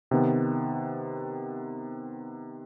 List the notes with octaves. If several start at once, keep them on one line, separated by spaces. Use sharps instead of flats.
C3 D#3 B3